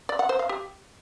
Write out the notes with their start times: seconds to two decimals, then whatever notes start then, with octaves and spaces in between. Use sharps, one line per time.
0.09 D5
0.19 F#5
0.29 C5
0.39 F5
0.49 G4